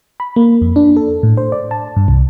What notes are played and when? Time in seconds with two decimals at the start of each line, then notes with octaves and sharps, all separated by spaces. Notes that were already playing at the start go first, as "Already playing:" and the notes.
0.20 B5
0.36 A#3
0.62 F2
0.76 D4
0.96 A4
1.23 A2
1.37 C5
1.52 D5
1.71 A5
1.96 G2
2.08 C2